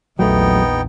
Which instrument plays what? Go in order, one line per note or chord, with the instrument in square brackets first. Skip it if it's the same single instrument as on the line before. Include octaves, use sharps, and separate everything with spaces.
[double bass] A#1 E2 [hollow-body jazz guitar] F#3 A3 [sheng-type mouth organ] B3 D#4 G5